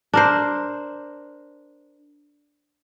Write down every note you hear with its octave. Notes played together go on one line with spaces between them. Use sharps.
D4 A#4 C5